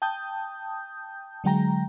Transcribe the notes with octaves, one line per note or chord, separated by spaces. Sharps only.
G5 A5 D#6 G6
D3 F#3 G#3 G5 A#5